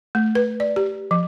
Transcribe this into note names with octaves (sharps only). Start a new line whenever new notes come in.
A3
B4
D5
G4
F3